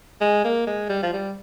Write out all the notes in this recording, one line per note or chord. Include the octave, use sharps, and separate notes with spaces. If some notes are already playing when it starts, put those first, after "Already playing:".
G#3
A#3
G#3
G3
F3
G3